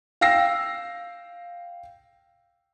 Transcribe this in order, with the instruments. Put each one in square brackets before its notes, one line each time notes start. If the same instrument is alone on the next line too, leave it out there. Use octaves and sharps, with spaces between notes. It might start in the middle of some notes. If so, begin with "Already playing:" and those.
[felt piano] F5 G5 E6 A#6 C7